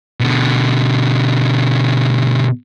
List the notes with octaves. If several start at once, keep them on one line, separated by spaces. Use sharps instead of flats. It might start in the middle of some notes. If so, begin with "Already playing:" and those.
B2 D3